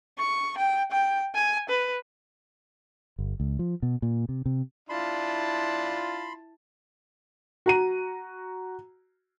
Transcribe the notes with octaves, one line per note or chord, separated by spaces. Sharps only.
C#6
G5
G5
G#5
B4
G1
C#2
F3
B2
A#2
C3
C3
D4 E4 F4 A5 B5 C6
F#4 A#5 D#7